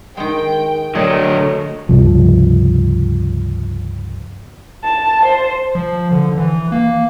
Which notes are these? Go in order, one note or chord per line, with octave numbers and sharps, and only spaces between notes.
D#3 G#3 G5
D3 F#3 A3 G#4 D5 D#5
C#2 G2 C3 F3
A5
C5
F3
D3
E3
A#3